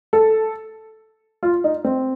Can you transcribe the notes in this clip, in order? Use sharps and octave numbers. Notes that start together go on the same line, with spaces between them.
A4
F4
D#4
C4